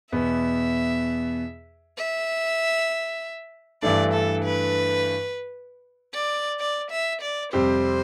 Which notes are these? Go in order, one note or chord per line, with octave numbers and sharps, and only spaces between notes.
E2 B2 B3 E5
E5
G2 E3 A3 D4 D5
A4
B4
D5
D5
E5
D5
F2 C3 G3 C4 G4 C5